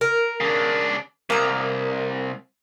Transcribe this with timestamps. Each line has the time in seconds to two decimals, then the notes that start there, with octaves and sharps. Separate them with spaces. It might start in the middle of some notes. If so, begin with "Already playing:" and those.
0.01 A#4
0.40 C#3 D4
1.30 C2 A#3 A#5